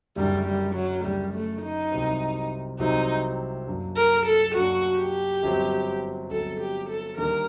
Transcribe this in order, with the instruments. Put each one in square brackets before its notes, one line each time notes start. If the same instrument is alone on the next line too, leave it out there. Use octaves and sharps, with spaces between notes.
[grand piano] F#1 F#2 D3 [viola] G3
[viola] G3
F#3
[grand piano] F#1 F#2 D3 [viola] G3
[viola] A3
D#4
[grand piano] C2 C3 F#3 C4
[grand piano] C2 C3 F#3 C4 [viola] D#4
[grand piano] F#2 F#3 A#3 D4
[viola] A#4
A4
[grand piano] F#2 F#3 A#3 D4 [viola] F#4
[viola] G4
[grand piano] G1 G2 F#3 C4
[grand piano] G1 G2 F#3 C4 [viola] A4
[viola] G4
A4
[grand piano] D#2 D3 G3 [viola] A#4